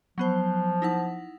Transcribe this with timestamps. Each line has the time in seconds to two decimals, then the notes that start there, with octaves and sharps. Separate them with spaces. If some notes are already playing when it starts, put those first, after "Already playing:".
0.18 F3 F#3 B3 C5
0.82 D#4 E4 F#5